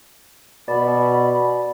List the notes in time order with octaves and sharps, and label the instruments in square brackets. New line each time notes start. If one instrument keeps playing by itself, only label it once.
[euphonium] B2 [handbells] D5 [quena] B5